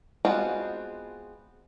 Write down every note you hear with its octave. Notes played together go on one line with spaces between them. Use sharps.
G#3 B3 C4 F4 F#4